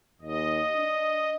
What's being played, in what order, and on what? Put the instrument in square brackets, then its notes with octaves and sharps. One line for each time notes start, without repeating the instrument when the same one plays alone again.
[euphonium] D#2 [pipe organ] D#5
[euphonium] D4